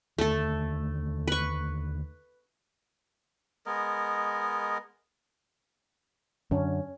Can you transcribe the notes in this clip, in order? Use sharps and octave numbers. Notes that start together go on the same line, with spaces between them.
D#2 D3 A3 A4
B4 C#6
G#3 B3 A#4 D#5
F#2 D3 C#4